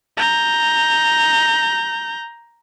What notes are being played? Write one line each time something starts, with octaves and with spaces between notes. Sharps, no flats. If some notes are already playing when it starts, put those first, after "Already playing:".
A#5 G6